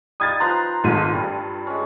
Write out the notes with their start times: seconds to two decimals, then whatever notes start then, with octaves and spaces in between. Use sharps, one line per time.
0.20 G3 D#4 F5 D#6 G#6 A6
0.40 F3 B4 A5 A#5 C6 F#6
0.84 G#1 G#2 G#3 F4 A4 D#7
1.13 G2 G3
1.67 G#3 C#4